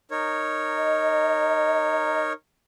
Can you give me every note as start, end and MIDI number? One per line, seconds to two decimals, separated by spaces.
0.11 2.33 63
0.11 2.33 70
0.11 2.33 73
0.78 2.22 75